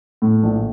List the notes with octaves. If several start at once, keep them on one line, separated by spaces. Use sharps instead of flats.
A2
A#1